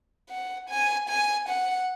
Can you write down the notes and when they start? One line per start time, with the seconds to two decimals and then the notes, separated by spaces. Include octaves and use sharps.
0.30 F#5
0.69 G#5
1.09 G#5
1.48 F#5